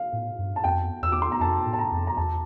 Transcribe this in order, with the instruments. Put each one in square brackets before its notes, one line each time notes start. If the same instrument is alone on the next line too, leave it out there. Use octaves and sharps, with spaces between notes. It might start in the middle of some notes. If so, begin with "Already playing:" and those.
Already playing: [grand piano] F5
[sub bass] A2
G2
[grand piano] A5
[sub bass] F2 [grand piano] G5
[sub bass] E2 [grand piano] E6
[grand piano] D6
C6
A#5
[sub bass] F2 [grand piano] A5
[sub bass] A2
[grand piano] A5
A#5
[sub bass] F2
[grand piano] A#5
[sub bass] E2 [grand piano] A5